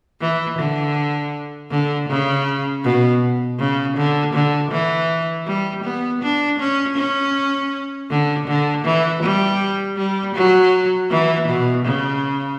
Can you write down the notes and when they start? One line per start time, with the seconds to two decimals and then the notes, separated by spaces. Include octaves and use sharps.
0.21 E3
0.59 D3
1.71 D3
2.09 C#3
2.84 B2
3.59 C#3
3.97 D3
4.34 D3
4.71 E3
5.47 G3
5.84 B3
6.22 D4
6.59 C#4
6.97 C#4
8.10 D3
8.47 D3
8.85 E3
9.22 G3
9.97 G3
10.35 F#3
11.10 E3
11.48 B2
11.85 C#3